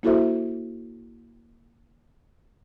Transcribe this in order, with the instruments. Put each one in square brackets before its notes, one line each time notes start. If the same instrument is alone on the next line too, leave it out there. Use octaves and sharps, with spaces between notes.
[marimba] A#3 E4 F#4 A4 C5 E5